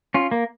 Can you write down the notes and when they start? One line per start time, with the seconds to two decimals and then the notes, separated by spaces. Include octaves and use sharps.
0.14 C#4 F4
0.31 A#3